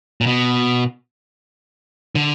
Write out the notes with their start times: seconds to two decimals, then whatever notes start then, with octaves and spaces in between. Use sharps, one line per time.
0.21 A#2
0.26 B2
2.15 D3